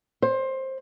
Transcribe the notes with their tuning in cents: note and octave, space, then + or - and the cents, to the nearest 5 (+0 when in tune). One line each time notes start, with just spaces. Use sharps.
C5 +20